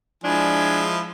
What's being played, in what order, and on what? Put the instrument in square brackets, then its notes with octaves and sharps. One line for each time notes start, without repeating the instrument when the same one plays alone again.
[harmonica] F3 G#3 E4 [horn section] D4 G#5